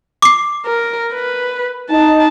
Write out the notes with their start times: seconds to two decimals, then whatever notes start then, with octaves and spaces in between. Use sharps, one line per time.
0.22 D6 C7
0.65 A#4
1.13 B4
1.90 D#4 A5